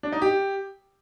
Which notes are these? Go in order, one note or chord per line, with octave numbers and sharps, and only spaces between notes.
D4
D#4
G4